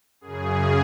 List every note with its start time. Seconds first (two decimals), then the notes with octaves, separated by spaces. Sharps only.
0.21 F#2 G#4
0.26 C#3